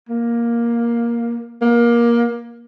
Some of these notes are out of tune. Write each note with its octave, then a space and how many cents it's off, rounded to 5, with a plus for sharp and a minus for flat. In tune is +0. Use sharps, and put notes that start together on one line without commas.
A#3 +10
A#3 +20